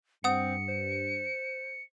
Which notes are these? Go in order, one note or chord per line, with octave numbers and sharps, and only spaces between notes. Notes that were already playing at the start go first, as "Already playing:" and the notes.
G2 C4 F#5 D#6 C#7
C5